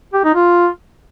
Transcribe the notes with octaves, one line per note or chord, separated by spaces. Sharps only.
G4
D#4
F4